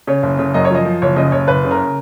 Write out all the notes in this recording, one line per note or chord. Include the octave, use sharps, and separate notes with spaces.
C#3 C#5
F#1
C#3
F#2 D#5
C#5
F3 D#5
F3
F#1 C#5
C#3 D#5
F#1 C#5
F#1 B4
C#3
A#4